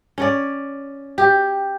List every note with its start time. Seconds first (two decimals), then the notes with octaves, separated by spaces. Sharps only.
0.18 C#4 C#5 D5
1.18 G4